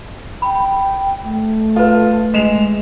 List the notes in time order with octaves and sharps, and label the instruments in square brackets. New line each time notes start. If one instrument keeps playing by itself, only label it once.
[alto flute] G5 [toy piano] B5
[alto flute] A3
[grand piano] F4 [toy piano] A4 B4
[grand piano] G#3 E7 F7